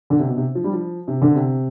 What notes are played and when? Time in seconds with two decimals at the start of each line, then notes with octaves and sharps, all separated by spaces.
0.10 D3
0.19 C3
0.28 B2
0.37 C3
0.55 F3
0.64 G3
0.73 F3
1.08 C3
1.22 D3
1.35 C3